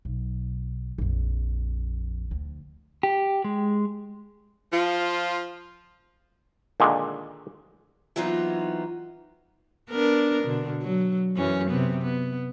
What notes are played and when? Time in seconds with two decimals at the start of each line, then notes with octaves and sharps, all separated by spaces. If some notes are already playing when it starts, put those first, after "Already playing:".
0.05 B1
0.98 A#1 F2
2.31 D2
3.03 G4
3.44 G#3
4.73 F3 F4
6.80 A#2 D3 D#3 G#3
8.16 E3 F#3 B3 C4 D#4 F4
9.90 B3 D4 A#4
10.43 B2 D3
10.82 F#3
11.36 F#2 E3 C#4
11.70 C3 B3
12.02 B3